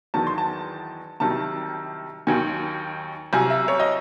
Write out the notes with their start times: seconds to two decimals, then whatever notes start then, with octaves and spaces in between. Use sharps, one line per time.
0.14 E2 D#3 F#3 A5
0.27 C6
0.38 A5
1.20 C2 C3 D#3 F#3 A5
2.27 D#2 D#3 F#3 G#5
3.33 C2 C3 F#3 G#5
3.50 E5
3.68 C#5
3.80 D#5